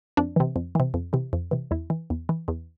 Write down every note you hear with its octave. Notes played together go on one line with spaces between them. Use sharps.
F2 D4
C3 E3
F2
C3 E3
F2
C3 E3
F2
C3 E3
E2 E4
E3
E2
E3
E2